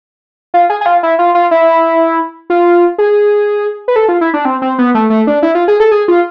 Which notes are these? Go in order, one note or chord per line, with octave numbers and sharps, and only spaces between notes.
F4
G#4
G#4
F4
E4
F4
F4
E4
F4
G#4
B4
A4
F4
E4
D4
C4
C4
B3
A3
A3
D4
E4
F4
G#4
A4
G#4
F4